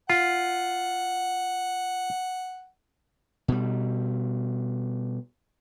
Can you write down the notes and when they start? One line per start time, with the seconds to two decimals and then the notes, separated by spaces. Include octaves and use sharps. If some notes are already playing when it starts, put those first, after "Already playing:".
0.10 F4 F#5
3.48 B2 G3